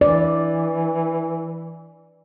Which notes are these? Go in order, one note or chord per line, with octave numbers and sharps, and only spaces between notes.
E3 D5